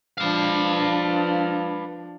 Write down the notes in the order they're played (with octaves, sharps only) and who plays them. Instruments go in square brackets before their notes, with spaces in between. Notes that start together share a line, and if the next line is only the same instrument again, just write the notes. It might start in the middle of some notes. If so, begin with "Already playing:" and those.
[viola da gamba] F3 D4 [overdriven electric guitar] B4 F5